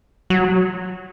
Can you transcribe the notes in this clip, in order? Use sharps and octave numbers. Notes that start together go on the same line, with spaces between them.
F#3